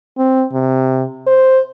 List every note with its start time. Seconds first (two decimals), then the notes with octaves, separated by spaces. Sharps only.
0.18 C4
0.53 C3
1.27 C5